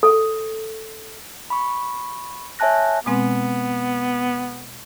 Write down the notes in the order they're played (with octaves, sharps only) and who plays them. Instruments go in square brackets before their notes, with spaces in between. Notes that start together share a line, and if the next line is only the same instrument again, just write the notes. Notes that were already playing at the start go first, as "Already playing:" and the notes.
[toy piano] A4
[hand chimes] B5 C#6
C#5 E5 G#5 A5 F#6 A#6
[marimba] B2 G#3 C4 [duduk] B3